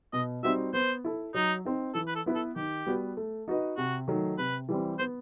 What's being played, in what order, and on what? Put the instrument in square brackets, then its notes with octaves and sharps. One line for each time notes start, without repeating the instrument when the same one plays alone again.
[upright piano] B2 [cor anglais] D#5
[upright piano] G3 C4 D#4 F#4 [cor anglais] E5
[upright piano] B3 [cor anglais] C5
[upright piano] E4 A4
[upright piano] F#3 [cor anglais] D#4
[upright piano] C4 D#4
[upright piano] E3 [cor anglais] A4
[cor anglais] B4
A4
[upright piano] B3 E4 B4
[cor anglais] A4
[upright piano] D#3 [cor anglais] G4
[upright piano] G3 B3 F#4 B4
A3
D#4 F#4 B4 D#5
[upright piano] C3 [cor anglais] F#4
[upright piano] D#3 F#3 A3
[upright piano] C3 [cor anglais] B4
[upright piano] E3 G3 C4
[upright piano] B3 [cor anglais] C5